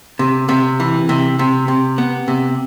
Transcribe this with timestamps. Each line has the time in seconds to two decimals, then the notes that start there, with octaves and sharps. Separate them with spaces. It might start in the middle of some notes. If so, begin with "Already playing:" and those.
0.19 C3
0.49 C3
0.80 E3
1.09 C3
1.39 C3
1.68 C3
1.98 B3
2.28 C3